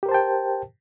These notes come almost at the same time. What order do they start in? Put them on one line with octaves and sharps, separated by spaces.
G4 A#4 C5 A5 G5